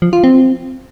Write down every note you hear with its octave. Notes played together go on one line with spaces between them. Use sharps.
F3
F4
C4